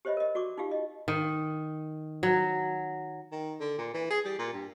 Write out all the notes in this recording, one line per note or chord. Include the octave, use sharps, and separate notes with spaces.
G4 C5 C#5 D#5 E5 B5
A#4 D#5
F#4 D5 C#6 D6
D#4 F4 G4 F5
D#5
D#3
F#3
D#3
D3
A#2
E3
G#4
G3
A#2
G2